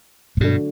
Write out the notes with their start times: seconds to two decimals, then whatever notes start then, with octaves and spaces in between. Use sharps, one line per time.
0.37 A2
0.40 G2 B2 D3 F#3 A3 D4